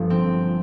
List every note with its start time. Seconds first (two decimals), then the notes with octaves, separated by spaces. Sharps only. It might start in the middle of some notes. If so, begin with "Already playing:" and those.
Already playing: G1 G2 F3 A#3
0.10 C4